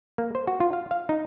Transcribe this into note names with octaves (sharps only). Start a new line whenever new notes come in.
A#3
C5
F#4
F4
F5
F5
D#4